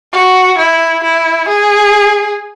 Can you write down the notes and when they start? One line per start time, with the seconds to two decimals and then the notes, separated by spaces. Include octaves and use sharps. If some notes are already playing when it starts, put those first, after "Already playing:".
0.13 F#4
0.58 E4
1.04 E4
1.49 G#4